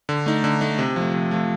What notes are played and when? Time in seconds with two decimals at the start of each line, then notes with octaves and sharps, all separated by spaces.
0.09 D3
0.26 A3 D#4
0.44 D3
0.61 A3 D#4
0.79 C3
0.96 F3 A3
1.14 C3
1.31 F3 A3